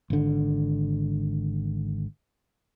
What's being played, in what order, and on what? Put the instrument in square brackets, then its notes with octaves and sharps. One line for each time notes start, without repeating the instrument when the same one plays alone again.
[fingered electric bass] G#1 D3